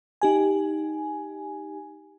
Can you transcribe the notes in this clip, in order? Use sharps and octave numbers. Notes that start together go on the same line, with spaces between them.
D#4 G4 G#5